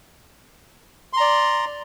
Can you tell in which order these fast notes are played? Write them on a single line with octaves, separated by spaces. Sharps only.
C6 A#5 D5